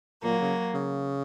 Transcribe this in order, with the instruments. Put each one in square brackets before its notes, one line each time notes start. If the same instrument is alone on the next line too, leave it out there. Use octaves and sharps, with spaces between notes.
[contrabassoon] A#2 [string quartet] F#3 A#3
[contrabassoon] C#3
C#3